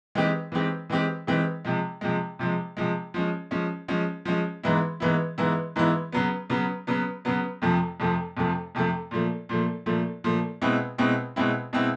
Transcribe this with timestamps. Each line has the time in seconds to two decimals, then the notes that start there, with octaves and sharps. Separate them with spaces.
0.15 E3 G#3 C4 D#4 G4
0.52 E3 G#3 C4 D#4 G4
0.90 E3 G#3 C4 D#4 G4
1.27 E3 G#3 C4 D#4 G4
1.65 C3 F3 G#3
2.01 C3 F3 G#3
2.39 C3 F3 G#3
2.77 C3 F3 G#3
3.14 F3 G#3 C#4
3.51 F3 G#3 C#4
3.88 F3 G#3 C#4
4.25 F3 G#3 C#4
4.63 G#2 E3 G#3 B3 E4
5.00 G#2 E3 G#3 B3 E4
5.38 G#2 E3 G#3 B3 E4
5.76 G#2 E3 G#3 B3 E4
6.12 C#3 F#3 B3
6.50 C#3 F#3 B3
6.87 C#3 F#3 B3
7.25 C#3 F#3 B3
7.62 F2 C3 F3 A3
8.00 F2 C3 F3 A3
8.37 F2 C3 F3 A3
8.75 F2 C3 F3 A3
9.11 A#2 F3 A3
9.49 A#2 F3 A3
9.86 A#2 F3 A3
10.24 A#2 F3 A3
10.62 B2 G#3 C4 E4
10.98 B2 G#3 C4 E4
11.36 B2 G#3 C4 E4
11.73 B2 G#3 C4 E4